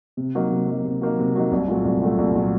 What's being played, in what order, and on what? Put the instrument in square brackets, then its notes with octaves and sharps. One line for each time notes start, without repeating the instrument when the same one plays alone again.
[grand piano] C3
F#3 A#3 D#4
C3
F#3 A#3 D#4
C3
F#3 A#3 D#4
C3
F#3 A#3 D#4
C2
A#2 F#3 A3
C2
A#2 F#3 A3
C2
A#2 F#3 A3